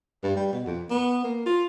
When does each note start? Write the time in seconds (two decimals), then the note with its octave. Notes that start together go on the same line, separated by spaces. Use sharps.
0.23 G2
0.36 G3
0.53 B2
0.66 F2
0.90 B3
1.24 A#3
1.46 F4